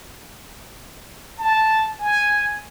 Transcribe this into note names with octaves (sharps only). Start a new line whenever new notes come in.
A5
G#5